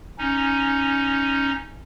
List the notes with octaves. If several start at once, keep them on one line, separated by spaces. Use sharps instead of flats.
C#4 D#4